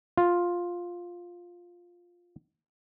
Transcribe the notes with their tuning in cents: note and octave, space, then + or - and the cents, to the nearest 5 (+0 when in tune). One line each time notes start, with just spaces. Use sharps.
F4 +5